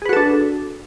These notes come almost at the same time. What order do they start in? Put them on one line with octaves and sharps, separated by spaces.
G#4 B4 F#4 A4 D4